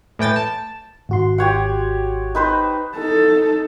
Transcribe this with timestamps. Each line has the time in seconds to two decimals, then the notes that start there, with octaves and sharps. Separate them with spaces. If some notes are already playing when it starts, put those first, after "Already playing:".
0.19 A2 E3 G5 A6
0.36 A5
1.09 G#1 F#4 C6
1.38 G4 C#5 F#5
2.35 D#4 B4 C5
2.97 D#4 A4